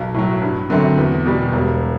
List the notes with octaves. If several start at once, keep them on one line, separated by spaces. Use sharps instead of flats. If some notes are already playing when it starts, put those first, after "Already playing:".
Already playing: B1
A2 F#3
G2
D3 F#3 A3 C4
E2
B2 G3
E1